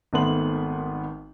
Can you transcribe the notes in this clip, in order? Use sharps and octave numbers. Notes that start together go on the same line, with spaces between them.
G#1 D#3 A3 B3 C6 F#7